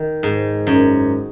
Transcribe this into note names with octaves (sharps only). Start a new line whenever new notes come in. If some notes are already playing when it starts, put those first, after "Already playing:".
Already playing: D#3
G#2
F#2